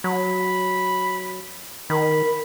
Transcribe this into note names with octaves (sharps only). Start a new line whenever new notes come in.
F#3 B5
D#3 A#4 B5